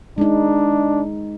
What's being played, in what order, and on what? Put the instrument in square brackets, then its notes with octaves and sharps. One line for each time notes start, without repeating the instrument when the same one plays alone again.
[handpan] G#3 D#4 [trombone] D4